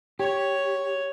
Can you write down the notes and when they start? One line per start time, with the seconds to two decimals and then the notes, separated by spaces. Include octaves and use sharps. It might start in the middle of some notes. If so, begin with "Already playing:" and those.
0.19 G4 C#5